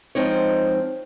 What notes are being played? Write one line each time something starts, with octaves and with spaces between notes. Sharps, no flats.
F3 G#3 C4 D#4 C#5